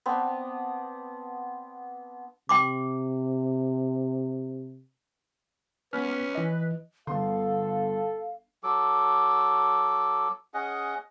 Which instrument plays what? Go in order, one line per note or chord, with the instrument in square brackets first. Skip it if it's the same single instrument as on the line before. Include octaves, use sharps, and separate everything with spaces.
[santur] B3 C4 D4
[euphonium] C3 [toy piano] G5 C6 D6
[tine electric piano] B3 F6 [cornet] C#4 [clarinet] B4
[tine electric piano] E3 D#5
[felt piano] G1 B3 C6 [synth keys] D3 [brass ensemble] A4 [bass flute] F5
[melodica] F#3 A4 D6
C#4 G#4 D#5 F#5